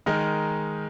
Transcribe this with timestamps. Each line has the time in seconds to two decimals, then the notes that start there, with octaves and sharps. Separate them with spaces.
0.06 D#3 G#3 D#4 A#4